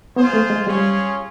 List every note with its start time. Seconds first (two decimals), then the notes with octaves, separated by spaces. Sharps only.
0.16 B3 F4 G#4 C5
0.33 A3
0.50 G#3
0.67 G3 C#4 F4 G#4 C#5